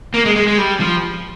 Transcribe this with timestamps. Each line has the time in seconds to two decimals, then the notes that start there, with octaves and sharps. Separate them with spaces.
0.14 A#3
0.26 G#3
0.36 G#3
0.47 G#3
0.58 G3
0.80 F3